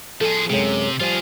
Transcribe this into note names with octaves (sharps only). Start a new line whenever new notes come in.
F3 G#4 A4
F#2 C3 G#3
F3 G3 F4 G#4